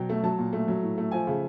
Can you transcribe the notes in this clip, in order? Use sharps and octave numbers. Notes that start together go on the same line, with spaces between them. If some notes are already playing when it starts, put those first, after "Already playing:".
Already playing: B2 F#3 G5
A3
F#3 A5
A#2
A3
F#3
A2
A3
F3 G#5
C#3